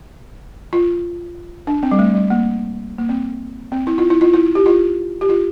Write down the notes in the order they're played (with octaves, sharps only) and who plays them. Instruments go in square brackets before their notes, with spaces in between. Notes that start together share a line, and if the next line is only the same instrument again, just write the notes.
[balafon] F4
D4
C4
G3
A3
G3
A#3
A#3
C4
C4
E4
F4
E4
F4
E4
G4
F4
G4
F4